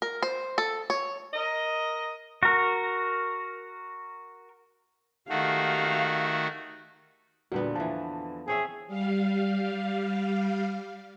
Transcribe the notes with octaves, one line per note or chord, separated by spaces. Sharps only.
A#4
C5
A4
C#5
A#4 D#5
F#4 A#4
D#3 A3 F#4 G4 F5
E2 A#2 D3 G3 B3 F#4
E3 F3 A5
C4 G#4 C#5 E5
G3 F5